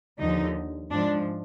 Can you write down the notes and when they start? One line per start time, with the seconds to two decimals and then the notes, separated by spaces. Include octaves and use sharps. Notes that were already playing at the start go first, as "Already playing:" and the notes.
0.19 D#2 D3 F3 D#4
0.90 G#2 F3 D4